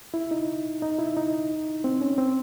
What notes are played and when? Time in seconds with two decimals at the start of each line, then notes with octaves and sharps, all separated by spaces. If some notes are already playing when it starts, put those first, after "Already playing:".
0.14 E4
0.31 D#4
0.82 D#4
0.99 E4
1.17 D#4
1.84 C4
2.01 C#4
2.18 C4